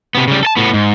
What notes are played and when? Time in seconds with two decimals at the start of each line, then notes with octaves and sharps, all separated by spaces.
0.15 C3 B3
0.28 C#3 G3
0.43 A4 A5
0.57 A2 B3
0.74 G#2